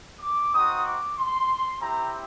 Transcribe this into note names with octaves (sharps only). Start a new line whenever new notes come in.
D6
C4 D#4 F#4 D#6
D6
C6
C4 E4 G4 A#5